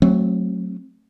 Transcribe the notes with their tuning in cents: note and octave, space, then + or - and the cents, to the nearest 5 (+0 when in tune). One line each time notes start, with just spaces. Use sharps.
F#3 +0 A3 +0 C4 +30